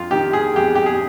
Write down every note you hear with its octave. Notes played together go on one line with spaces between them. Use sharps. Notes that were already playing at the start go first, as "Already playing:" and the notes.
Already playing: F2 F4
D#3 G4
G#4
F2 G4
G4
G#4